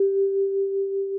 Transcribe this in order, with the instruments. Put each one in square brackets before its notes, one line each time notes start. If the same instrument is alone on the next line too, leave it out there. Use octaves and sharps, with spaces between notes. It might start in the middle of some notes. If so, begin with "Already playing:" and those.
Already playing: [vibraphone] G4